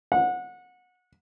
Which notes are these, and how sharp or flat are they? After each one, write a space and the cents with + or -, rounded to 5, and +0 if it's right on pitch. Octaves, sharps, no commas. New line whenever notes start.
F#5 -25